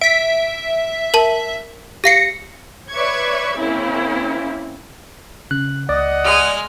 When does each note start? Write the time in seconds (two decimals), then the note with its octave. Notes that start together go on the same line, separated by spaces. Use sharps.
0.01 E5 B6 D7
1.14 A#4 A5
2.04 G4 F5 A#6 C7 C#7
2.92 B4 C#5 D5 E5 C#6 G#6
3.57 C#3 A#3 C4 C#4 E4
5.51 C#3 F#6
5.89 C#2 D5 D#5 F#5
6.24 G#3 F6